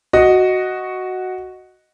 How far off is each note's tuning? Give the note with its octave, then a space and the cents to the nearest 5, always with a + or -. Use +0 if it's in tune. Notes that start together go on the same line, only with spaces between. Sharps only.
F#4 +0 D#5 +0